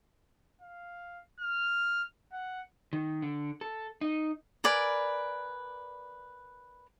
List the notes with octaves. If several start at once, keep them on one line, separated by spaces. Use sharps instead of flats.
F5
F6
F#5
D#3
D3
A4
D#4
A#4 B4 D5 G#5